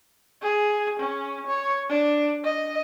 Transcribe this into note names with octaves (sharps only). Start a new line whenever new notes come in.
G#4
C#4
C#5
D4
D#5